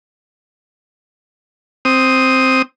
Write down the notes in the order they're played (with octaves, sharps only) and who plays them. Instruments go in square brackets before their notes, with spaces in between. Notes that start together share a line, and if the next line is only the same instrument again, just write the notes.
[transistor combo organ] C4 D#6